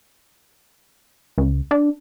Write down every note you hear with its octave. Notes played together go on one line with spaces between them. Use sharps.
C#2
D4